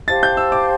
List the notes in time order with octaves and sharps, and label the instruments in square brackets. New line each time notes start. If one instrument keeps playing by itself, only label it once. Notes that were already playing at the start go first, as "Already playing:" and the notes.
[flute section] G4 C5 F5 A5 [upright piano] A6
[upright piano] G6
E6
D6